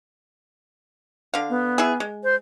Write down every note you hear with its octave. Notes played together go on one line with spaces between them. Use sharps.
D3 F5
B3
E4 G#4
G#3
C5